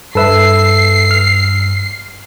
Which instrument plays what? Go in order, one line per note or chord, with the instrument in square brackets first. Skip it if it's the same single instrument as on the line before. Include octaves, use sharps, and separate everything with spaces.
[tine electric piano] G2 E6 [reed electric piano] A4 B4 E5 [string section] C7
[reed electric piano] F6